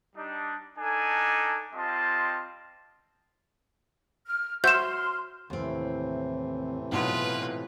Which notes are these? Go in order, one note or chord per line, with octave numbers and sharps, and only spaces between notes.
G3 D4 D#4
D4 D#4 A4 G#5
G3 C4 F4 D#5 A5 C6
F6
F#4 C5 E5 C6 F6 G6 E7
D#2 A2 C3 E3 C4
G#2 B2 F#3 F4 G4 B4